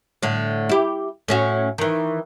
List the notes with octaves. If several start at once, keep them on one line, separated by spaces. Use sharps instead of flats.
A2 D3
E4 G4
A2 C#4 F#4
D#3 E3